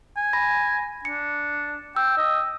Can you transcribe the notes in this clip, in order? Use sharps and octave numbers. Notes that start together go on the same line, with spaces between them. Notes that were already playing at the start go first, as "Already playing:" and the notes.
G#5
B5 A#6
D4 C#7
G5 E6
D#5